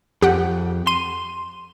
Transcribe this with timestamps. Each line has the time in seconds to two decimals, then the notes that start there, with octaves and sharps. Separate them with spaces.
0.22 F2 G4 F#5
0.87 C6 D#7